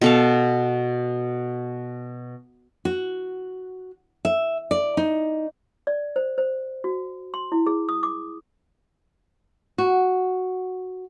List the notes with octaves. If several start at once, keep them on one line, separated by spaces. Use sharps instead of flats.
B2 A4 F5
F#4
E5
D5
D#4
D5
C5
C5
F#4
C6
E4
G#4
D#6
D6
F#4